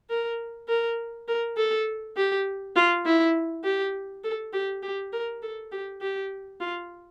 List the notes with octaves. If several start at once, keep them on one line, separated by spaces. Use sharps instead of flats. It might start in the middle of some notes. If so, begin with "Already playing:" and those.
A#4
A#4
A#4
A4
G4
F4
E4
G4
A4
G4
G4
A#4
A4
G4
G4
F4